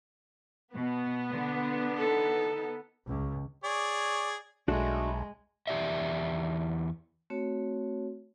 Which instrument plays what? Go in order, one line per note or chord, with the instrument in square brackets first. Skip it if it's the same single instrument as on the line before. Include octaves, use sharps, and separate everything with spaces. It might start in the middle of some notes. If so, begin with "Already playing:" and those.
[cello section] B2 [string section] B3
[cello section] D3
[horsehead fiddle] D#4 A4
[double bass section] C#2
[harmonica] G#4 C#5 D5
[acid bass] B1 [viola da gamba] G#3 [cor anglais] A3 [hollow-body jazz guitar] D4 F#4 A4
[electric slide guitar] E2 G4 D5 E5
[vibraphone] A3 C4 F#4 C#5